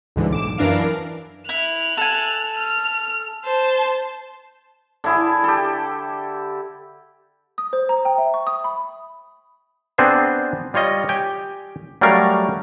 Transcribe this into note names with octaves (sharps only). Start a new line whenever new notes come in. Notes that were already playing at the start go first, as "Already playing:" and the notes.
D2 G#2 D3 E3
B1 D6 E7
F#2 E3 D4 A#4 F5 D7
E4 F#6 F7
A4 G#5
F6
C5 A5
D3 E4 G#4
G4 A4
D#6
C5
A#5
G5
E5
C#6
D#6
B5
B3 C4 D4 G#4 B4 C5
G3 F4 C#5 D#5
G4 G5 G#5
F#3 G3 A3 C#4 A#4 F5